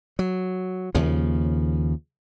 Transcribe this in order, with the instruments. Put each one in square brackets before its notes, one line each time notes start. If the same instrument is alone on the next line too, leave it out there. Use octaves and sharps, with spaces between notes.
[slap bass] F#3
D#2 C#3 F3